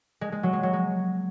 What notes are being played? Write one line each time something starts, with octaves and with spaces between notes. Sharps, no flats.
G#3
G#3
F#3
G#3
F#3
G#3